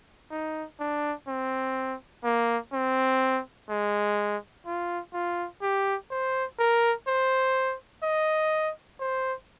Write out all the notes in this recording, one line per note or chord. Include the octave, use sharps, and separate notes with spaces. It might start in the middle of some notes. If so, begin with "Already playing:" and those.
D#4
D4
C4
A#3
C4
G#3
F4
F4
G4
C5
A#4
C5
D#5
C5